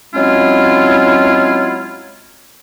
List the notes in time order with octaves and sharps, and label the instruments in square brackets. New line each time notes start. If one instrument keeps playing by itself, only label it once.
[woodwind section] F#3 G#3 C4 C#4 E4 F4